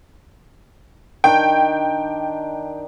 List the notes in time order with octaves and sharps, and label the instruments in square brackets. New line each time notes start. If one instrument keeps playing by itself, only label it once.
[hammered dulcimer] D#3 D4 [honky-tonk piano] G5